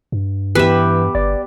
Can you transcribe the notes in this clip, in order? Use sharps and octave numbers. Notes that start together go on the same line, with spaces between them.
G2
E3 B3 G4 B4 E5
G1 D5